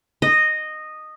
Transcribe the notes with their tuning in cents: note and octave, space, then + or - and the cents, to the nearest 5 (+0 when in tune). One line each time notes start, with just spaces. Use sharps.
D#5 -10